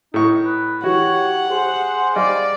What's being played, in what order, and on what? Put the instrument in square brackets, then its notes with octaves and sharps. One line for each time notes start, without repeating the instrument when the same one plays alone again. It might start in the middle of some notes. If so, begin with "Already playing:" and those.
[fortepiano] A2 C#6 [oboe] D#4
[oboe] B4
[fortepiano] E3 F#4 [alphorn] G4 [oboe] C#5 [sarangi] F#5
[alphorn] G#4 [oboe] C5
[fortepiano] G3 D#5 [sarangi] D5 [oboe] F5